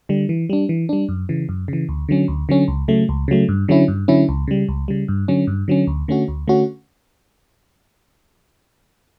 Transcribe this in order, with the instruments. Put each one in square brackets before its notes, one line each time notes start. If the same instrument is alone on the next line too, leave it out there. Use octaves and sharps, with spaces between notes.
[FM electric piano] D3 G3
E3
G3 D4
E3
G3 D4
F#2
C#3 E3
F#2
C#3 E3
D2
D3 F#3 C#4
D2
D3 F#3 C#4
C#2
C#3 F#3 A3
C#2
C#3 F#3 A3
G2
D3 F#3 C#4 E4
G2
D3 F#3 C#4 E4
C#2
C#3 G3
C#2
C#3 G3
G2
D3 F#3 C#4
G2
D3 F#3 C#4
D2
D3 A3 C#4 F#4
D2
D3 A3 C#4 F#4